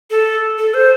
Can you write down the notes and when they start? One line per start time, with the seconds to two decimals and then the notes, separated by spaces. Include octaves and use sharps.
0.10 A4
0.58 A4
0.74 C5